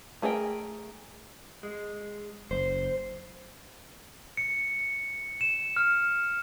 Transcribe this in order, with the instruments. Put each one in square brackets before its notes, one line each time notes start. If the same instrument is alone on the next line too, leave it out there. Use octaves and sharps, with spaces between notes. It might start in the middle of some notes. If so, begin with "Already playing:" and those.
[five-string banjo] A3 G#4 A#4 D5 G5
[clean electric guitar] G#3
[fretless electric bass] F#1 [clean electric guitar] C5
[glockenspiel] C#7
E7
F6